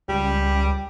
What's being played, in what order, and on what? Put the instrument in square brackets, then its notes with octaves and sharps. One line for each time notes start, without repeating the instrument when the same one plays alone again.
[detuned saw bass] C#2 [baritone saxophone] G3